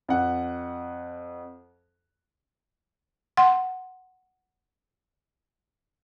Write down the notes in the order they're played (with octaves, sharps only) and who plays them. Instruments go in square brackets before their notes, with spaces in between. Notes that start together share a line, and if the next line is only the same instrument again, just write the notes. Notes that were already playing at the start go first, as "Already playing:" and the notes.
[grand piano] F2 F#5
[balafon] F#5 C6